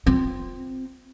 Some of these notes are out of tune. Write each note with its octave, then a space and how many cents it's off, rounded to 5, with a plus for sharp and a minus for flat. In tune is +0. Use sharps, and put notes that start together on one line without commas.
C4 -5 F4 +20